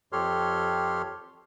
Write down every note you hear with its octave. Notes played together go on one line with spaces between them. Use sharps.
F2 G4 A4 C#5 C6 F6